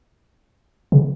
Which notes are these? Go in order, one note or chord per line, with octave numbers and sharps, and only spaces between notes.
C#3